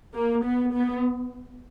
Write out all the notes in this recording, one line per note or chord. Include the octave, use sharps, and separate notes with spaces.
A#3
B3
B3